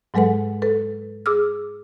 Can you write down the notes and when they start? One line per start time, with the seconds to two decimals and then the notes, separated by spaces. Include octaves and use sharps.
0.14 G#2 F#3 G#3 A4 B4 F#5
0.62 A4 B4
1.26 G#4 D6 E6 F6